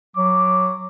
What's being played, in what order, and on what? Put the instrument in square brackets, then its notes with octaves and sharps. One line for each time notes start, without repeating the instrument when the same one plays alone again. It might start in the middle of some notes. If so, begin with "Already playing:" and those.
[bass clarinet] F#3 [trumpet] D6